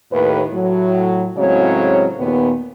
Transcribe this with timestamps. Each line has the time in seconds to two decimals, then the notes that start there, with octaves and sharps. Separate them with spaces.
0.12 D#2 A2 B4
0.53 A2 F#3
1.37 A2 C#3 F#3 G#3 C4 C#5
2.19 D#2 A#2 B3